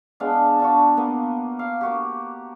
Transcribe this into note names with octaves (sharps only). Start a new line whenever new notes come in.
G#3 B3 D4 F5
A5
D4 F4 F#4
A#3 B3
F5
A#3 F#4 G4